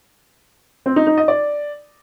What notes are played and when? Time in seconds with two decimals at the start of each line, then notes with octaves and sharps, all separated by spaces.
0.86 C4
0.96 D#4
1.07 D#4
1.18 D#5
1.28 D5